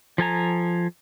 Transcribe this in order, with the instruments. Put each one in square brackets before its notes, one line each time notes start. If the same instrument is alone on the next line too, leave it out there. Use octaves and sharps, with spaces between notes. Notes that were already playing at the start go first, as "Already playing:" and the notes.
[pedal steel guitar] F3 A4 G#5 A#5